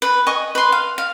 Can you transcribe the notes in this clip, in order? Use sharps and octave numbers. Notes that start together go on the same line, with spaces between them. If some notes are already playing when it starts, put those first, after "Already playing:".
B4
D#5 G#5 C#6
B4 C6
F5
F5